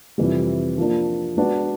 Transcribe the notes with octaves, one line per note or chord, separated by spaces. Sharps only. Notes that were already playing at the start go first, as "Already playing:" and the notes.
F2 C3 E3 G3
F3 A#3 D4
G#3 B3 D4 F#4 B4